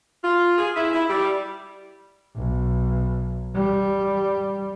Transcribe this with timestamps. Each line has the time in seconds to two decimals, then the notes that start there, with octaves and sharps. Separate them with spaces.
0.22 F4
0.58 G#4
0.75 E4
0.93 E4
1.09 G3
2.36 B1
3.55 G3